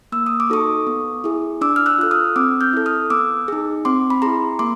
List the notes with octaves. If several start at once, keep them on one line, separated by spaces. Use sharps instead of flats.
A#3 E6
D#6
D6
D#4 F#4 A4 C#6 D#6
B3
E4 G#4
D4 D6 E6
F6
E6 F#6
F4 A4 F#6
D#6 F6
C4 D6 E6
F6 G6
E4 A4
D#6 F6
B3 D6 E6
D#4 G#4
C4 C6 D6
B5
E4 G#4 A#5 C6
A#3 C6 D6